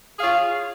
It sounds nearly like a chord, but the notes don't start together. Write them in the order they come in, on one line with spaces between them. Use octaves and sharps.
G#4 F5 C#5